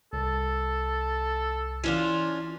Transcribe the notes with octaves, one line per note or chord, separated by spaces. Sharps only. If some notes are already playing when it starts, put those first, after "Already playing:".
C2 A4
E3 C#4 D4 F4